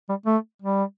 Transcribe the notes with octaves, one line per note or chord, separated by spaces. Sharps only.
G3
A3
G3